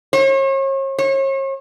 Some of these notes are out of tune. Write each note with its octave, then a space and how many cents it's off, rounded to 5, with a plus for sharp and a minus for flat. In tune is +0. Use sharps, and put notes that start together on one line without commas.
C#5 -40
C#5 -40